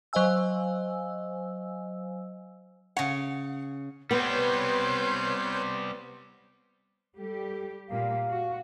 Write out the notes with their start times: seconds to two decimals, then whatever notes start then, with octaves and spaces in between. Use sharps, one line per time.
0.13 F#3 C5 D#5 F5 G#5 E6
2.97 C#3 C#5 F#5
4.11 G3 B3 C4 B4 C#5 C6 G6
7.17 G3 G4 A4
7.89 A#2 G3 A#3 F5
8.29 F#4